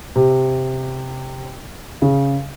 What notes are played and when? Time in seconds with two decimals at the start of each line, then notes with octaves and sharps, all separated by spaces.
0.16 C3
2.02 C#3